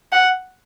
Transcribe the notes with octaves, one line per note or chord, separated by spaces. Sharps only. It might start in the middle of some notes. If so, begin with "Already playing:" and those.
F#5